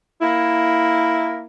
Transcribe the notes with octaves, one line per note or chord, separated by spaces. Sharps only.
A#3 E4